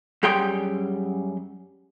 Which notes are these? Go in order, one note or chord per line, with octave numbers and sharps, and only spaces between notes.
F#2 G3 G4 G#4 G5 C6